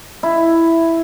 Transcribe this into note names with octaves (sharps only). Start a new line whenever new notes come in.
E4